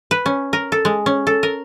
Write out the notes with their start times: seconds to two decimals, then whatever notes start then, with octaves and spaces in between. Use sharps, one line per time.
0.11 B4
0.26 C#4
0.53 A#4
0.72 A4
0.85 G#3
1.06 C#4
1.27 A4
1.43 A#4